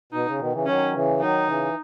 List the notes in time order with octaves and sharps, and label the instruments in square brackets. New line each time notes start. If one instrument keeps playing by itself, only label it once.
[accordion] B2 [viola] D#4
[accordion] C#3
B2 D#3
C#3 E3
[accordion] D#3 F#3 [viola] C#4
[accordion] C#3 E3
[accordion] D#3 F#3 [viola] D#4
[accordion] C#3 E3